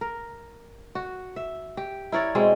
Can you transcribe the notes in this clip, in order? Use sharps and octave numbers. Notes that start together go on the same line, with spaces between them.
A#4
F#4
E5
G4
E4 A#4 C#5 D5
B2 G#3 C4